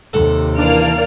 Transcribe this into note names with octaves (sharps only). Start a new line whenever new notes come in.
D#2 C3 A4 F#5
E3 A#3 D4 D5 F6